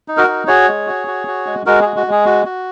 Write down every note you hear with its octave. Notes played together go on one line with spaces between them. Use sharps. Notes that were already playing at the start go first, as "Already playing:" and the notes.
D#4
F#4 A#4
D#4
F#4 G#4 C#5
G#3
F#4
F#4
F#4
G#3
G#3 F#4 A#4
F#4 G#4
F#4
G#3 G#4
F#4
F#4